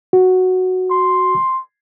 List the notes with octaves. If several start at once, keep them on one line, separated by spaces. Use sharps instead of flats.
F#4
C6